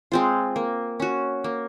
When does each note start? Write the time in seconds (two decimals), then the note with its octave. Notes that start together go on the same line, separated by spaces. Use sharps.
0.12 G#3 C4 F4
0.56 A#3
1.00 C#4 F#4
1.44 A#3